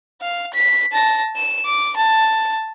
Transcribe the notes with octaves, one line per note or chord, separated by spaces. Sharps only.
F5
B6
A5 A#6
E7
D6
A5